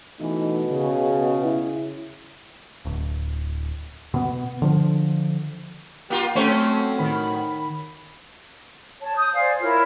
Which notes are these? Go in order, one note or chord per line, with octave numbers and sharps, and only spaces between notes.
B2 E3 A3 D#4
C#3
E4
D1
B2 B3
D3 F3
A#3 F4 G4
F#3 A3 C4 C#4 A4 C5
A2 D#3 B5
C#5 A5
D#6 G6
C5 D5 F5 G#5
E4 F4 A#4 C#5